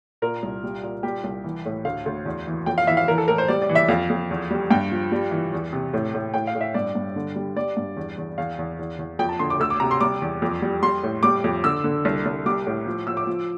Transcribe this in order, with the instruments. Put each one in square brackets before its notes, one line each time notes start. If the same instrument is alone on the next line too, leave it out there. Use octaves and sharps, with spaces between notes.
[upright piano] A#2 A#4
C2
G3
A#2
G3 G4
C2
E3
A2
D2 F5
D2
E2
E3
F2 G5
F5
E3 E5
F5
E3 A#4
A4
A2 A#4
C5
G3 D5
D5
E3
E5
F2 F5
F2
E2
G3
G2 G5
F3
G3
E3
E2
C3
A2
A2
A2 G5
F5
A2
E5
G2 D5
G2
D3
G3
G3 D5
G2
E2
E2
E2 F5
E2
E2
E2
F2 G5
A5
D3 C6
D6
D2 E6
D6
C3 A#5
C6
G3 D6
E2
F2
G3
G3 C6
A2
G3 D6
F2
D3 E6
D3
C2
C2
G3 D6
A2
F3
F3 E6
D6
F3